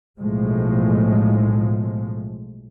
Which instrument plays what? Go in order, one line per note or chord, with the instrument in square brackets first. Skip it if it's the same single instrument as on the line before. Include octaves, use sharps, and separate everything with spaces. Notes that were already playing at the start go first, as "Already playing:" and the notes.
[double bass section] B1 A2 F3 G#3